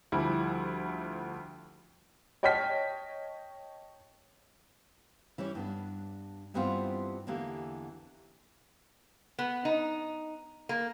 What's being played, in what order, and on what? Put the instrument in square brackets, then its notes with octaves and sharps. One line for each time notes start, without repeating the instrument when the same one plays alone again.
[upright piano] D2 F3 G3 [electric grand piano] E4
[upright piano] C#5 D#5 G5 A5 F6 B6
[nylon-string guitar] E3 G3 C#4 C#5
G2 B3 D4
G2 E3 G3 B3 C4 F4
E2 D3 E3 A#3 G4
[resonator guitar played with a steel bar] B3
D#4
A#3